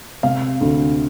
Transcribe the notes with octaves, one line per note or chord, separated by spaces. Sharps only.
C3 F5
D2